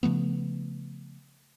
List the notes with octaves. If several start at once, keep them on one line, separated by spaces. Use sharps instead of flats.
C#3 F3 A3 B3